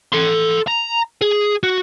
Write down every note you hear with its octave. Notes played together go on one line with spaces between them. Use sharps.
A4 C6
A#5
G#4
F#4